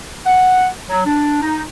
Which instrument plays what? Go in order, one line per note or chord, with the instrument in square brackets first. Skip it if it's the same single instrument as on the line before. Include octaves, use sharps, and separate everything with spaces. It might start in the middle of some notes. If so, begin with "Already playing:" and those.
[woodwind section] F#5
F#3
D4
D#4